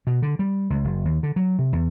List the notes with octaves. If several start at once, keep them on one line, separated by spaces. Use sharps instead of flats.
B2
D3
G3
C#2
F#1
D#2
D3
F#3
C3
E2